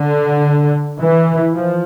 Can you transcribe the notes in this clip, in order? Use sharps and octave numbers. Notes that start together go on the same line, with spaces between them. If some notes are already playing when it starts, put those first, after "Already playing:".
Already playing: D3
E3
F3